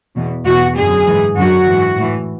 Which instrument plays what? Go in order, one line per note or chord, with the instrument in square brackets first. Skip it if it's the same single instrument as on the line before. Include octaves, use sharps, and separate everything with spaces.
[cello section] E2 B2
E2 B2 F#4
F#2 D3 G#4
G#2 E3
F#2 D3 F#4
G#2 E3
A2 E3